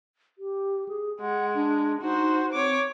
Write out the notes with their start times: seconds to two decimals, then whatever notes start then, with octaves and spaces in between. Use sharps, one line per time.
0.38 G4
0.88 G#4
1.20 G#3 F#5
1.55 D4
2.01 D#4 F#4 C5
2.53 C4 C#5 D6